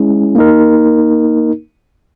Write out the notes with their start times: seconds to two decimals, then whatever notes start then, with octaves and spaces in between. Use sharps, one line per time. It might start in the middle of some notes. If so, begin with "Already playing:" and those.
Already playing: G#3 C#4 E4 G#4
0.35 A#3 D#4 A#4